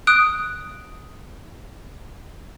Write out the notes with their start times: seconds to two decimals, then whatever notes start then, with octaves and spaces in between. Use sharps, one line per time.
0.07 D#6 F#6 D7